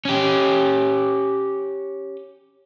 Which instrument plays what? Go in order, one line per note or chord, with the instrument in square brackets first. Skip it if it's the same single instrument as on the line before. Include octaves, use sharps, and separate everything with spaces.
[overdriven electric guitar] C#4 G4